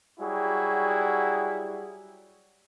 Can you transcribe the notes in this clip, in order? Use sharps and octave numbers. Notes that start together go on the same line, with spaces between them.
F#3 G3 E4 F#4 G#4